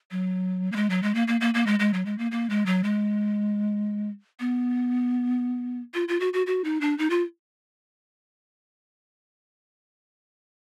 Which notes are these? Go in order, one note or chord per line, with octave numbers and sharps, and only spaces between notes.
F#3
A#3
G#3
F#3
G#3
A#3
A#3
A#3
A#3
G#3
G#3
F#3
G#3
A#3
A#3
G#3
F#3
G#3
B3
F4
F4
F#4
F#4
F#4
D#4
D4
D#4
F4